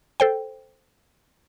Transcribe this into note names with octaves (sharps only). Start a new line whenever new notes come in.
A4 C5 G5